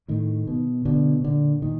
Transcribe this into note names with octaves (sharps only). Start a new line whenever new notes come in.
A2 D#3
B2
B2 D3
A#2 D3
A#2 D#3